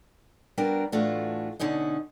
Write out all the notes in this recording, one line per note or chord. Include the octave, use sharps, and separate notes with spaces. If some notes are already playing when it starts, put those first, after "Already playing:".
G3 B3 D4 F#4 A#4
A2 E3 A3 D4 F4 F#4
B2 D3 C#4 D#4 D#5